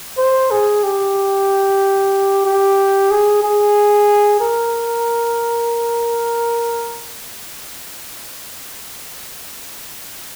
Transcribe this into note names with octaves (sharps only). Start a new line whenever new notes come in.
C5
G#4
G4
G4
G#4
G#4
A#4